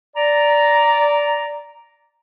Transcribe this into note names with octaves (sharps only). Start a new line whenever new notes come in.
D5 A#5